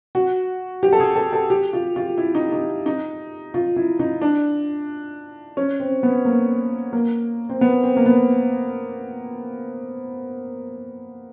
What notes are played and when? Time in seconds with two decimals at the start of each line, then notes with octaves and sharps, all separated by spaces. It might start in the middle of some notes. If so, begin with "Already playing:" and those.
0.15 F#4
0.83 G4
0.93 A4
1.00 G#4
1.16 A4
1.33 A4
1.50 G4
1.73 F4
1.96 F4
2.18 E4
2.35 D#4
2.52 D#4
2.86 D#4
3.54 F4
3.76 E4
3.99 D#4
4.21 D4
5.57 C#4
5.80 C4
6.03 B3
6.25 A#3
6.93 A#3
7.49 C4
7.61 B3
7.83 C4
7.97 A#3
8.06 B3